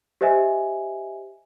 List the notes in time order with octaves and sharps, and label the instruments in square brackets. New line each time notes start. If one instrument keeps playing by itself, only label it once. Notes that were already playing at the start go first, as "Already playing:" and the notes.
[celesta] G4 C5 D#5 E5 G#5